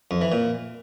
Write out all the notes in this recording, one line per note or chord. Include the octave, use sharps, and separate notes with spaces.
F2
E3
A#2